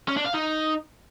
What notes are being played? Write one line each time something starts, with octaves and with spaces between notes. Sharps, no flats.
C#4
D4
F5
D#4